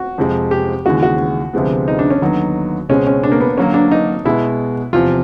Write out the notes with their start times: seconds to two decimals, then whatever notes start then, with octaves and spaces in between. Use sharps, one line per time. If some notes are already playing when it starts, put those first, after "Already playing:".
Already playing: F#4
0.18 F2 C3 F3 G#3 C4
0.51 G4
0.85 D#2 C#3 E3 G#3 F#4
1.03 F#4
1.53 D2 C3 F3 G#3 B3
1.88 D#4
1.99 D4
2.10 C#4
2.22 D#2 D3 F#3 B3 D#4
2.89 C#2 B2 G#3 C4 C#4
3.07 C#4
3.23 D4
3.32 A#3
3.41 B3
3.57 D3 F#3 A#3 C#4
3.74 D4
3.92 D#4
4.25 B2 G#3 B3 E4
4.93 E2 C3 F3 F4